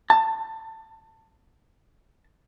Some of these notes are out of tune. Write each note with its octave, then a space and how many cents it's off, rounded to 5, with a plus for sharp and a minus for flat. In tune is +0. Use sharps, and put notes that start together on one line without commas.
A5 +20